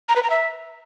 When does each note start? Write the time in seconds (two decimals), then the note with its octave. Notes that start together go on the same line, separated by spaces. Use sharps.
0.09 A#5
0.16 B4
0.23 A#5
0.30 E5